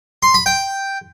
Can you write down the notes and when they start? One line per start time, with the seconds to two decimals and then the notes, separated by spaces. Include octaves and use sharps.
0.23 C6
0.34 B5
0.46 G5